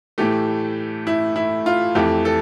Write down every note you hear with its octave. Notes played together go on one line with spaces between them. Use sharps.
A2 E3 A3 G4
E4
E4
F4
F2 E3 A3 G4
A4